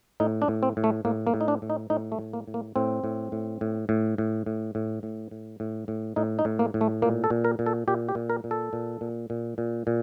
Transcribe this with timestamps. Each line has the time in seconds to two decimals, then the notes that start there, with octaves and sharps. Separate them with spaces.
0.20 A2 D#4
0.42 D4
0.48 A2
0.63 C4
0.77 A2
0.84 A3
1.05 A2 A#3
1.27 A#3
1.34 A2
1.41 D#4
1.48 D4
1.62 A2
1.70 D#4
1.90 A2 D#4
2.12 A3
2.19 A2
2.33 A#3
2.48 A2
2.54 A#3
2.76 A2 C4
3.04 A2
3.32 A2
3.61 A2
3.89 A2
4.18 A2
4.46 A2
4.75 A2
5.03 A2
5.31 A2
5.60 A2
5.88 A2
6.16 A2 D#4
6.39 D#4
6.45 A2
6.59 A#3
6.74 A2
6.81 A3
7.02 A#2 A#3
7.24 A4
7.30 A#2
7.45 A#4
7.59 A#2
7.66 A4
7.88 A#2 G4
8.09 G4
8.15 A#2
8.30 A#4
8.44 A#2
8.51 A4
8.73 A#2
9.01 A#2
9.30 A#2
9.58 A#2
9.87 A#2